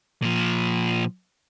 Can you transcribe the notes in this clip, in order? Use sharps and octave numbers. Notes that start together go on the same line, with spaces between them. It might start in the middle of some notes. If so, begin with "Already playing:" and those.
A#2 F3